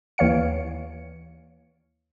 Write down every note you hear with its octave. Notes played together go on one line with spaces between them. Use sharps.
D#2 E3 C#5 F5 C#7